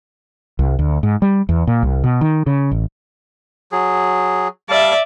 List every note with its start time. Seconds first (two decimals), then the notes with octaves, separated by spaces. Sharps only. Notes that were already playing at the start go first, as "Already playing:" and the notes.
0.59 C2
0.79 D2
1.03 G#2
1.22 G3
1.49 E2
1.67 A#2
1.83 C2
2.04 B2
2.21 D#3
2.46 C#3
2.71 A1
3.72 F#3 G#4
4.69 G3 D5 E5 F5 A5